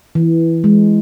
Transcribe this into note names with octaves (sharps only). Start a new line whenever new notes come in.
E3
G#3